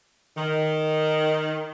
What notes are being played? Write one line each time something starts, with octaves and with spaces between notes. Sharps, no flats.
D#3